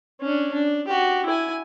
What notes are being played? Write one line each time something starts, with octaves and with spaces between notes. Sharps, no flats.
C#4 D4
D4
F#4 G4
E4 G#5